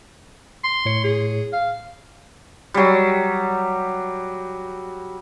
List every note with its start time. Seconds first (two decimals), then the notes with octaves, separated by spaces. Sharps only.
0.64 C6
0.85 A2 C#5 C#7
1.04 G#4
1.53 F5
2.74 F#3 G3